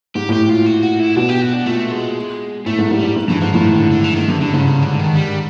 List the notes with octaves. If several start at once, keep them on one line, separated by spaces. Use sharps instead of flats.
G#2 G4
A2
G4
A#2 F4
F#4
F#4
E4
B2 D4
G4
F#4
D4
A#2 A3
G#3
A2 A3
G#2
G#2 G3
G#2
G#2
G2 E3
G#2 F3
A2 F3
D#3
D3
D3
E3
G#2 D#3
G2 D3
G2 D3
G#2 C#3
C#3
D3
D#3
G3